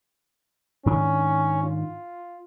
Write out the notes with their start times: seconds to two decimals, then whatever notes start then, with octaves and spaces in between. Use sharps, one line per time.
0.86 G#2 D#3 C#4 D4
1.63 F4